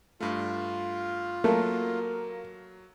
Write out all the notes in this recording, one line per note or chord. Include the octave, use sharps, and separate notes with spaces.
G2 A3 F4
F#3 A3 A#3